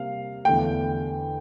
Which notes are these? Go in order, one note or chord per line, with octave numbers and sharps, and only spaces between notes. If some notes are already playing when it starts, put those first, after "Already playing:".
Already playing: C3 G3 A#3 F5
E2 D3 A3 G5